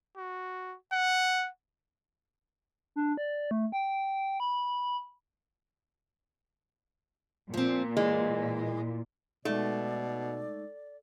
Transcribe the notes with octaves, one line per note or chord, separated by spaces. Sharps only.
F#4
F#5
D4
D5
A3
G5
B5
A#2 F3 C4
E3 G#3
B2 G#3 A3 D#4 D5